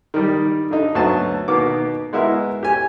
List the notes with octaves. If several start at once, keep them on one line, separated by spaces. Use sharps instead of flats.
D#3 G3
D3 D#4
D2 F#3 B3 A5
B2 D#3 A#3 B3 D6
G#3 B3 E4 F#4 A#4
G4 G#5